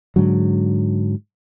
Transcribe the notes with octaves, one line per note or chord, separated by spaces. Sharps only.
G#2 D3 F#3